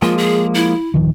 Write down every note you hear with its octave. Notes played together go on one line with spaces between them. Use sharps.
F3 G#3 A#3 F4
G#4
E4
D1 D#3 F3